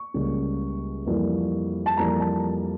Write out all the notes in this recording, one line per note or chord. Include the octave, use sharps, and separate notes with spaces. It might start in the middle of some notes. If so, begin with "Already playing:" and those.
Already playing: C#6
C#2 C#3 G3 A#3
F2 E3 G3 A#3
A5
F2 E3 G3 A#3 A#5
A5